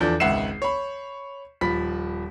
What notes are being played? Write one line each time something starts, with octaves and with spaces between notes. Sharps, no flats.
E2 F3 D4 A4 G6
G#1 C#2 E5 F#5 C7 E7
C#5 B5
D#1 F3 B5 B6